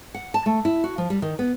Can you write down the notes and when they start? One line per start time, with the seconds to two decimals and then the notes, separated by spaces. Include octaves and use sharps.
0.14 F#5
0.34 A5
0.46 A3
0.65 E4
0.84 F#4
0.98 F3
1.10 G3
1.22 D#3
1.39 B3